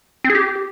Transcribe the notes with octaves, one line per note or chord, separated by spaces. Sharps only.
C4
G#4
G4